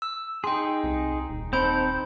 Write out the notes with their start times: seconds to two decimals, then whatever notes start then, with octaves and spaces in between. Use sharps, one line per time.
0.02 E6
0.44 D#4 G#4 G5 C6
0.84 C2
1.29 D#1
1.53 C4 D#4 A4 C5 B5 G6